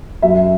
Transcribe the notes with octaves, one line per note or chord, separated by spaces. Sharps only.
F#2 E5